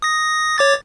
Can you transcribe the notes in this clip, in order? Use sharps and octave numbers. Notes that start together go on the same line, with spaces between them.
D#6 A#6
C#5 D6 A6